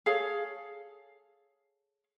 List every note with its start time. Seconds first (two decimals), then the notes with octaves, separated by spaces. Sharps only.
0.06 G#4 A4 C#5 F5